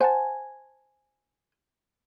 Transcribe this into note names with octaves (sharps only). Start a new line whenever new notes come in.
C5 F#5 G#5 A5